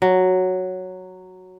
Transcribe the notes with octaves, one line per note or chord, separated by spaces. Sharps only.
F#3